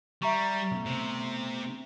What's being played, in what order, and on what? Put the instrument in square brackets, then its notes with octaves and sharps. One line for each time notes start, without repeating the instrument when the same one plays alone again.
[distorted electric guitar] G3 [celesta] E5 A#5 C#6
[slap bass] B2 A3
[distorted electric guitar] C3